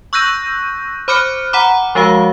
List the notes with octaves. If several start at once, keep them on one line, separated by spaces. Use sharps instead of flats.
C#6 E6 F#6 G6 A#6 D#7
C5 B5 D6 F6 F#6 C#7
F#5 A#5 B5 D6
F3 G#3 F#4 F5